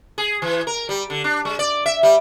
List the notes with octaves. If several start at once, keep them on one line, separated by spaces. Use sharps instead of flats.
G#4
E3
A#4
G3
D3
D4
G#3
D5
E5
G3